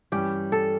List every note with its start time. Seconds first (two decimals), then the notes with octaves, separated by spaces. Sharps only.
0.12 G2 E3 G3 C#4 G4
0.52 A4